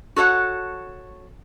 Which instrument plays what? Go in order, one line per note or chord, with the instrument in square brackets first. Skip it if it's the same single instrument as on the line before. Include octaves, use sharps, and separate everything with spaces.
[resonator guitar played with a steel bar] F#4 A4 C#5 F#5